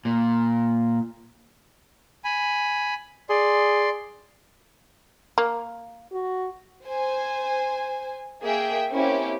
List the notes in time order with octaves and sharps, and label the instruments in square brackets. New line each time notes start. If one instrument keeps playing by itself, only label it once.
[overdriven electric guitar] A#2
[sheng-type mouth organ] G#5 B5
[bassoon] G#4 [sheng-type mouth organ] D5 C6
[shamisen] A#3
[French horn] F#4
[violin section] C5 G#5
A#3 G#4 E5 G5
A#3 C4 C#4 E4 G4